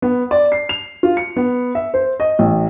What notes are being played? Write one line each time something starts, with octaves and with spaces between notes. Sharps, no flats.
B3
D5
C7
F7
F4
C#7
B3
E5
C5
D#5
A1